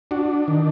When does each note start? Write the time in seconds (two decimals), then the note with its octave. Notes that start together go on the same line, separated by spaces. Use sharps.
0.11 D4 F#4
0.48 D#3